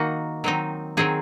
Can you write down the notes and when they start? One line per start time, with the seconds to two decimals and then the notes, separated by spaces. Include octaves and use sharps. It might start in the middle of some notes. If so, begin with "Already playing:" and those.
Already playing: D#3 A#3 D#4 F#4
0.44 D#3 F#3 C4 D#4
0.97 D#3 F#3 C4 D#4 G#4